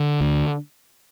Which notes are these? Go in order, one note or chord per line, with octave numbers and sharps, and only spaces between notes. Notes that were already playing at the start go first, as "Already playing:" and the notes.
Already playing: D3
D2